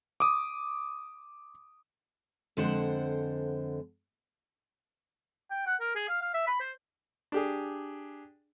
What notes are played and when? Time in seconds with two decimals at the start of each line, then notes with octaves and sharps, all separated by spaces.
0.20 D6 D#6
2.57 F2 D3 G#3 C5 F#5
5.51 G5
5.67 F#5
5.80 A#4
5.95 G#4
6.09 F5
6.21 F5
6.34 E5
6.47 B5
6.60 C5
7.32 D4 G4 G#4